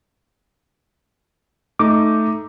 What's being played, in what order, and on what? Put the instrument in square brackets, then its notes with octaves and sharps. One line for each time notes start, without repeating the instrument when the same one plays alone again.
[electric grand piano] A3 D#4 [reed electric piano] D6